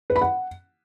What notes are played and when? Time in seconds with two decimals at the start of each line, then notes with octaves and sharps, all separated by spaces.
0.10 B4
0.16 B5
0.21 F#5